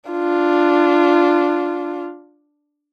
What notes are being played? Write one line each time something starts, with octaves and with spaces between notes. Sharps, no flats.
D4 F4